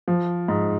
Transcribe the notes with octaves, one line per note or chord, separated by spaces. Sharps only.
F3
G#2